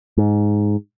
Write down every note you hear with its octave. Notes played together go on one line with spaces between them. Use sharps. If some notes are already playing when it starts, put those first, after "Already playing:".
G#2